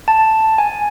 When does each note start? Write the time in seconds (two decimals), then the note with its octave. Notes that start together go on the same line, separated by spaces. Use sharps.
0.08 A5
0.58 G#5